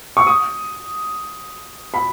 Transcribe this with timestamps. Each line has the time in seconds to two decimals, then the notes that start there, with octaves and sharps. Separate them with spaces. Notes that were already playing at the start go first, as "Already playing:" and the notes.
0.17 C#6
0.27 D#6
1.94 B5